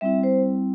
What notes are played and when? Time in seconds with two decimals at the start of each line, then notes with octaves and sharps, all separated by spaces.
0.01 G3 C4 E4 E5
0.24 C5